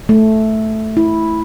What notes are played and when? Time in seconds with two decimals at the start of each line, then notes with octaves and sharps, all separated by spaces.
0.09 A3
0.97 E4